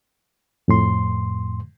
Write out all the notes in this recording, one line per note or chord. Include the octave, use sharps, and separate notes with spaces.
F2 A2 C6